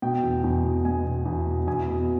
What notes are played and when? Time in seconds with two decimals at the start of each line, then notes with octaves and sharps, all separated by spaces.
0.02 B2 G5
0.23 E2
0.44 E2
0.64 B2
0.85 B2 G#5
1.05 B2
1.26 E2
1.47 B2
1.67 E2 G#5
1.88 B2